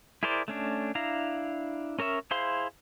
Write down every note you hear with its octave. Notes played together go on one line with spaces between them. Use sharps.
E4 G#4 A#4 C5 D5
A3 C#4 D4
D4 E4 F5 A#5
C#4 A#4 C#5 E5
E4 G#4 C5 F5 C6